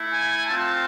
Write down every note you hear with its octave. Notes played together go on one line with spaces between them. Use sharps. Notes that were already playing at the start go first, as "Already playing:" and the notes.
Already playing: A3 E4
G#5
A3 C4 F4 A5